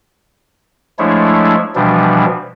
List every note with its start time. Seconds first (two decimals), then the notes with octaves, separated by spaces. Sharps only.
0.99 F3 G#3 A3 D4 E4 C#5
1.75 B2 E3 F3 G3 D4